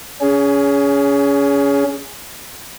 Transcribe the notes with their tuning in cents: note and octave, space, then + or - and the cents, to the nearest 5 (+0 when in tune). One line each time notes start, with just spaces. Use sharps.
C#4 +25 G#4 +0